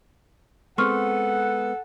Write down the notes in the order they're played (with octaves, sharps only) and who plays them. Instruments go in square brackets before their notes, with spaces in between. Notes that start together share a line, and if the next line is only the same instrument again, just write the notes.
[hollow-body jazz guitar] G#3 B3 C4 [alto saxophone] A4 [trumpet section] F#5 [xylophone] C6 C#6 F6